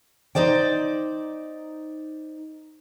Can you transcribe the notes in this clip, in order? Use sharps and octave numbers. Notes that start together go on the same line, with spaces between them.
D#4 C5 D5 G5